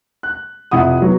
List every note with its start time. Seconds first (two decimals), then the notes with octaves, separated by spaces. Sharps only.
0.23 F#6
0.71 F2 C3 E4 F#5 D#6
1.02 F#3 B3